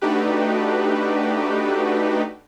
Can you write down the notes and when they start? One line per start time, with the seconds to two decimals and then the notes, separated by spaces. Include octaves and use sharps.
0.01 A3 D4 D#4 F#4 G4 B4